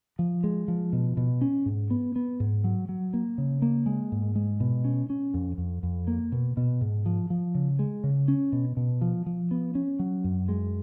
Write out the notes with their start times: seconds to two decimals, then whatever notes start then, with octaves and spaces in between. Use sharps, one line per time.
0.19 F3
0.44 G#3
0.68 F3
0.93 B2
1.17 B2
1.41 C#4
1.66 G#2
1.90 B3
2.16 B3
2.40 G#2
2.64 F#3
2.89 F#3
3.13 A#3
3.38 C#3
3.62 A#3
3.86 G#3
4.12 G#2
4.35 G#3
4.60 B2
4.85 C#4
5.10 C#4
5.34 F2
5.58 F2
5.83 F2
6.07 A#3
6.32 B2
6.57 B2
6.81 G#2
7.06 F3
7.30 F3
7.55 C#3
7.79 G#3
8.04 C#3
8.28 C#4
8.52 B2
8.77 B2
9.01 F3
9.26 F3
9.51 B3
9.75 C#4
9.99 F#3
10.24 F#2
10.48 G#3